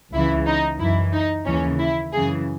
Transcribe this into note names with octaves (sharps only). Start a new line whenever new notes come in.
C#2 C#3 E3 E4
D#4
F#2 E3 E4
D#4
D#2 C#3 E3 C#4
E4
F#2 C#3 E3 G#4